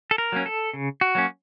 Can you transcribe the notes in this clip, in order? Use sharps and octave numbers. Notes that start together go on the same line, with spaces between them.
A4
A#4
F#3 A#3 C#4
A4
C#3
F#4
F#3 A#3 C#4